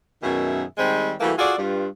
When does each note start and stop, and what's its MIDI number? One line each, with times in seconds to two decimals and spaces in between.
0.23 0.63 42
0.23 0.63 47
0.23 0.63 51
0.23 0.63 68
0.23 0.63 76
0.78 1.14 51
0.78 1.14 55
0.78 1.14 56
0.78 1.14 60
1.21 1.32 52
1.21 1.32 55
1.21 1.32 57
1.21 1.32 58
1.21 1.32 66
1.21 1.32 69
1.38 1.55 65
1.38 1.55 66
1.38 1.55 68
1.38 1.55 69
1.38 1.55 74
1.58 1.87 43
1.58 1.87 65